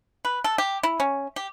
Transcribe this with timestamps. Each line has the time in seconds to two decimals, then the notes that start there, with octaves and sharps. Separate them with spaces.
0.25 B4
0.44 A4
0.58 G4
0.83 E4
1.00 C#4
1.36 G4